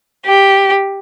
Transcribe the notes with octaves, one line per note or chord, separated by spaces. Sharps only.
G4